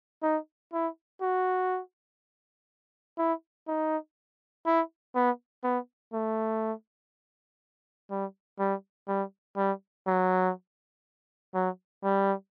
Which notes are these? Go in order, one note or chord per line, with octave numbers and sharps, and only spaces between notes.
D#4
E4
F#4
E4
D#4
E4
B3
B3
A3
G3
G3
G3
G3
F#3
F#3
G3